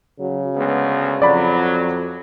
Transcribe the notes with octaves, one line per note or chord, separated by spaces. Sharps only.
C#3 F#3
D2 G#3 B3
F2 F#3 D5 B5